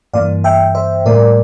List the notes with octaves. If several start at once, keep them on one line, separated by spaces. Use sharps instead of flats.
G2 E3 A#3 D5 F5
E5 G5
C5 E5
A2 G3 A#3 A#4 D5